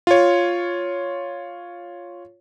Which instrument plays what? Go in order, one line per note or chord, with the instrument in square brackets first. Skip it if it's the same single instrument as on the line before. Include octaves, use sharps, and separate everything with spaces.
[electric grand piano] F4 C#5